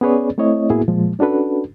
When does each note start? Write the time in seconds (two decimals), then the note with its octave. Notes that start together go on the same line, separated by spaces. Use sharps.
0.01 B3 C#4 G#4 B4 C#5 D5
0.38 A3 C4 E4 C#5 D#5
0.70 A2 A#3 B3 E4 F#4 G#4
0.88 A#2 F3 G#3
1.19 C#4 D4 F#4 A4 B4